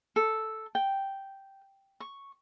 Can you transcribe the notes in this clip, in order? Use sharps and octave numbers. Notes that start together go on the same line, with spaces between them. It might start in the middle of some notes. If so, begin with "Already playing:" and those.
A4
G5
C#6